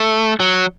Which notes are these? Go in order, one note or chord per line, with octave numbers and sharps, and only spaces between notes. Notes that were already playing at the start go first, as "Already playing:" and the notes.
Already playing: A3
F#3